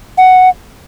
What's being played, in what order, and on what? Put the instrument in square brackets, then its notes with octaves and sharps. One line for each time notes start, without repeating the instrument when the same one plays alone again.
[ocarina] F#5